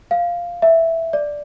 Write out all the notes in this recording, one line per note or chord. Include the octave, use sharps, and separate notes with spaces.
F5
E5
D5